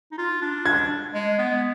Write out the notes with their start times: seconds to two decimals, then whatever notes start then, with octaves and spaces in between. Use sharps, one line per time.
0.11 D#4
0.18 F4
0.41 D4
0.65 D4 G#6
1.14 G#3
1.38 B3